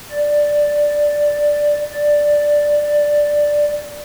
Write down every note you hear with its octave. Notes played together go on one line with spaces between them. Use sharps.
D5
D5
D5